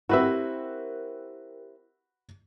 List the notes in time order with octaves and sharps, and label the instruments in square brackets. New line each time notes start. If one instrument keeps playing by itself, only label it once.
[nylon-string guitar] C4 E4 [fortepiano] F#4 B4 E5 [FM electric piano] G4 A#4